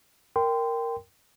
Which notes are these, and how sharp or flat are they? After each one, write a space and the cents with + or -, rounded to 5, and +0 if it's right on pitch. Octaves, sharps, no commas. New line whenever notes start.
A#4 -5 G5 +0 C6 -25